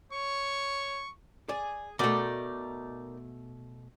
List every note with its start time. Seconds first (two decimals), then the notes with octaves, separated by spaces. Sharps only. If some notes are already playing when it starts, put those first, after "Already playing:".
0.12 C#5 C#6
1.49 G#4 D5
1.99 B2 A3 D#4 A#4 D5